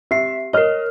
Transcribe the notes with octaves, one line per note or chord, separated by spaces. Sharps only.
C4 G4 E5 C7
A#4 C#5 D#5 F6